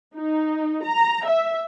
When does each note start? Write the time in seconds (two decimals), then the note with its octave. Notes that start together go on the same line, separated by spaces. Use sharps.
0.15 D#4
0.84 A#5
1.27 E5